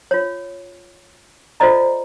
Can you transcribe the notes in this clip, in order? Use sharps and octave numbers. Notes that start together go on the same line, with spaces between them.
F4 C#5
F4 A4 C5 D5 D#5 A#5